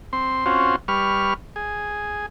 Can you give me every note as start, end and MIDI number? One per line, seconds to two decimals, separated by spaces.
0.13 0.46 60
0.13 0.46 84
0.46 0.76 60
0.46 0.76 61
0.46 0.76 65
0.46 0.76 66
0.46 0.76 72
0.88 1.34 55
0.88 1.34 71
0.88 1.34 85
0.88 1.34 89
1.56 2.26 68